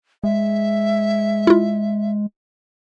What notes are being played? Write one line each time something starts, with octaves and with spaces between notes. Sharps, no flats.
G#3 E5
E4 F4